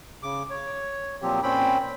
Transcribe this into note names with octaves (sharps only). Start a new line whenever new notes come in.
C#3 D6
C#5
A#2 F3 F#3 C4 G4
A#2 C4 C#4 G5 B5